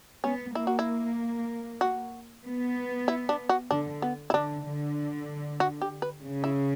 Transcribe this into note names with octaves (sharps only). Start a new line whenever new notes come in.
B3 C#4
A#3 E4
F#4
E4
F#4
B3
E4
D4
F#4
D3 D4
B3
E4
D3 D4
D3
F#4
G4
B4
C#3
E4